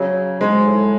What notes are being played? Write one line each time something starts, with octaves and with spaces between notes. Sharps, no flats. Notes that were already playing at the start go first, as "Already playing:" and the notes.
Already playing: C#3 F#3
G#2 G#3
A2